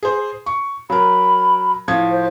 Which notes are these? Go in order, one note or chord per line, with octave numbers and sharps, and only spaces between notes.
G#4 C5
C#6
F#3 A#4 B5
A2 F3 G#6
C5